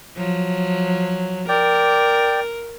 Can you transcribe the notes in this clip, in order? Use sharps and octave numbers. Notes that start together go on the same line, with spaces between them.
F3 F#3
A#4 D5 G5